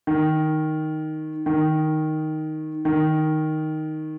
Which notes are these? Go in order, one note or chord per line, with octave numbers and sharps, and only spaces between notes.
D#3
D#3
D#3